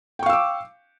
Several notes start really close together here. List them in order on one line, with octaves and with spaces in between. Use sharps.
G5 C#6 F5 E6 D6